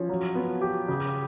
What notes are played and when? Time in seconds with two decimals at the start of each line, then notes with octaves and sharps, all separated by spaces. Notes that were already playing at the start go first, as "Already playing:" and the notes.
Already playing: F3 C#4
0.09 F#3
0.35 B3
0.61 G4
0.88 C#3